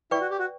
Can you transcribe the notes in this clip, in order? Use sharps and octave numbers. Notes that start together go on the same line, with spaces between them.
E4 B4 D5 G5 C#6
F#4
G4
F#4